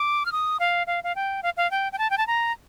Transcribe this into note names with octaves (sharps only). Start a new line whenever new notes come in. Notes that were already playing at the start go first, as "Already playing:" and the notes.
Already playing: D6
F6
D#6
F5
F5
F5
G5
F5
F5
G5
G5
A5
G5
A5
A#5